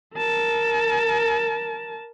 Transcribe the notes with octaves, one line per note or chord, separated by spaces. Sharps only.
A#4 A5